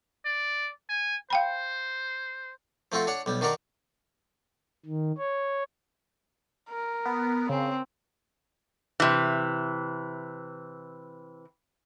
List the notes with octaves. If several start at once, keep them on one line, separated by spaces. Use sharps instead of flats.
D5
G#5
C5 F5 G5 B5
F3 A3 C4 F4 F#4
D4 C#5 F#5
B1 G3
D#3 D4 F#4 A#4 D5
D#3
C#5
A#4
B3
C#3 C4
C3 E3